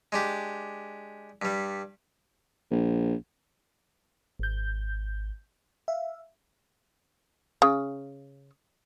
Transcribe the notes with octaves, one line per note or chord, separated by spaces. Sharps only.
G#3 D4 G4
G2 G3
A#1
G#1 G6
E5 F5
C#3